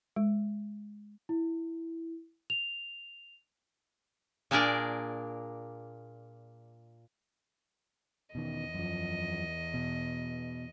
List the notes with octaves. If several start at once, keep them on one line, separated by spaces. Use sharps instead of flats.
G#3
E4
F7
A#2 A#3 D4 G#4 A#4 D5
E2 B2 D#3 D#5
F#2 F3
B2